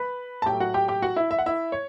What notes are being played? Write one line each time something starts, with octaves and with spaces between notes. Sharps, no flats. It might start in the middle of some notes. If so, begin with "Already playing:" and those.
Already playing: B4 B5
A5
A2 F#3 A3 G4 G5
F#4 F#5
G4 G5
G4 G5
F#4 F#5
E4 E5
E5
F#5
E4 E5
C#5